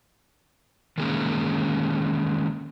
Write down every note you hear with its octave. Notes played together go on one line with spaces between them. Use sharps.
D#3 E3 G#3 A#3 C#4